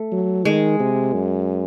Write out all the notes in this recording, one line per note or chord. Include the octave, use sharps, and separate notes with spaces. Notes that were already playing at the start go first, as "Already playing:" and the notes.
Already playing: A3
F#3
D#3 G#3
C3
F#2